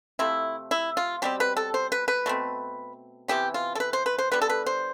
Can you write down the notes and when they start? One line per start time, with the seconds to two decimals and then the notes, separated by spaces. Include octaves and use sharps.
0.19 C3 F3 A3 E4
0.71 E4
0.97 F4
1.22 B2 G3 C4 G4
1.40 B4
1.57 A4
1.74 C5
1.92 B4
2.08 B4
2.26 B2 A3 C4
3.28 C3 E3 B3 G4
3.54 F4
3.75 A4
3.80 B4
3.93 C5
4.06 B4
4.18 C5
4.31 D3 G3 B3 B4
4.42 A4
4.49 B4
4.66 C5